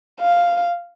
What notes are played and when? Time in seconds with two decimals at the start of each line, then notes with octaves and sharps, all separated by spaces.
0.21 F5